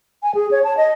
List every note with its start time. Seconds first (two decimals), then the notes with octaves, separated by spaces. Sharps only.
0.23 G#5
0.35 G#4
0.51 C#5
0.64 A5
0.77 D#5